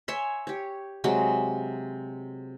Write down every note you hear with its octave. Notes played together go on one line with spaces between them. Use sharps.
C#5 E5 G#5 C6
G4 C#5
C3 F#3 G#3